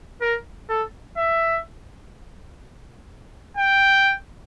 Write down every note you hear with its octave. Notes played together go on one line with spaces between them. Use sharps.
A#4
A4
E5
G5